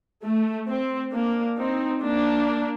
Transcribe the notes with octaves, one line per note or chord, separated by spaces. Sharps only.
A3
C4
A#3 D4
C4 D#4
A#3 D4